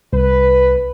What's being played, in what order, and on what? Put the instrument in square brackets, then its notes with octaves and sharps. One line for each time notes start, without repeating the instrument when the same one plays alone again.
[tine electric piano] C2 [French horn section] B4